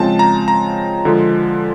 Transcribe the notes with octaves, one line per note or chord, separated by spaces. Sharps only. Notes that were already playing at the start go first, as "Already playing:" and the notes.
Already playing: C#3 F3 G#3 C4 A5
A#5
A#5
D3 F3 G#3